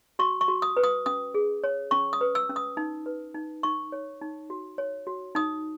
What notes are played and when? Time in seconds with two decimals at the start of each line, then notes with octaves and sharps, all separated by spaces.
0.19 F#4 C#6
0.41 C#6
0.48 F#4
0.62 D#6
0.77 B4
0.84 D#6
1.06 C#4 D#6
1.34 G#4
1.64 C#5
1.91 C#4 C#6
2.13 D#6
2.21 B4
2.35 E6
2.50 C#4
2.56 D#6
2.77 D#4
3.06 B4
3.34 D#4
3.63 D#4 C#6
3.92 C#5
4.22 D#4
4.50 F#4
4.78 C#5
5.07 F#4
5.35 D#4 D#6